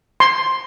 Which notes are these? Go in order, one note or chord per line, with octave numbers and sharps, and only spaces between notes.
C6